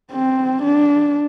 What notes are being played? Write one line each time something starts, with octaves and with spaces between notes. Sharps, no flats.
C4
D4